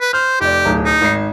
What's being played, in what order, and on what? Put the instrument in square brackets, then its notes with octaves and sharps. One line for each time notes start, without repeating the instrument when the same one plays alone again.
[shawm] B4
[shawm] C5 [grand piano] F6
[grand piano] F1 D5 [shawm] G4
[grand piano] D1 B1 A#5
[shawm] D#4
[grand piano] G#1 C7